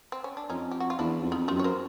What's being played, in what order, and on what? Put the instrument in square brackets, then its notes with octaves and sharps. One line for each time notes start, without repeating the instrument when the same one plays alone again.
[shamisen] C4
C#4
D4
[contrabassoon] F2 [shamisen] C#4 D#4
[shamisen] G4
F#4
F4
[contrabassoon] E2 [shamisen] D4 E4
[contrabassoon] F2
[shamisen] D#4 F4
[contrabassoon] F#2 [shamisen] F4 G4
[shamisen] C#5
A#4 C5